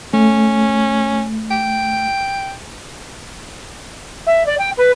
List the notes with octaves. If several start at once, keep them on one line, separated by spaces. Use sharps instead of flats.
A3 C#4
G5
E5
D5
G5
B4